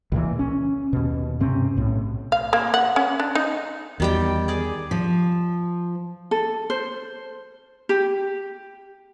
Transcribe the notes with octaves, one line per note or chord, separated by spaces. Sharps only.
C#2 A#2 E3
C#4
D#2 B2
G2 C3 C4 C#4
B1 A2
F5
A#3
F#5
C#4
D4
D#4
E2 D#3 G3 G5
G#4 D5
F3
A4
C5
G4